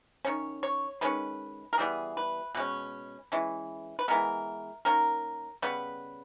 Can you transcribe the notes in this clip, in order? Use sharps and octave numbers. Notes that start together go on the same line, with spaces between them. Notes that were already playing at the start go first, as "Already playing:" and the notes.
D#3 A#3 C#4 C#5
C#5
D#3 G#3 C#4 B4
A#4
E3 G3 B3 G#4
B4
B2 G#3 C#4 B4
E3 G#3 C#4
B4
E3 G#3 B3 A#4
D#3 A#3 C#4 A#4
C#3 G3 B3 B4